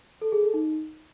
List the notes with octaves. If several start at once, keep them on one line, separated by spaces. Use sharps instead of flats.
A4
G#4
A4
D#4